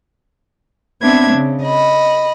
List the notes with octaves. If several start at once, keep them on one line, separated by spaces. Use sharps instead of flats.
B3 C4 D4 E5 G#6
C#3
D#5 B5